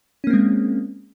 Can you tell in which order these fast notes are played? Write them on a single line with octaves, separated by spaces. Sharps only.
C#4 A#3 C4 G#3